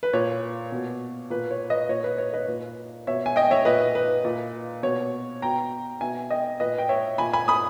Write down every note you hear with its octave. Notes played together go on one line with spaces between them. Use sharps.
B4
A#2 C#5
B2
A#2 B4
C#5
B4 D#5
A#2 C#5
B4
C#5
B4 D#5
A#2
B2 C#5 E5
G#5
D#5 G5
C#5 E5
A#2 B4 D#5
B4
A#2
B2 C#5
B2 G5 A#5
B2 E5 G#5
D#5 G5
A#2 B4 D#5
G5
C#5 E5
A#2 G#5 B5
G#5 B5
B5 D#6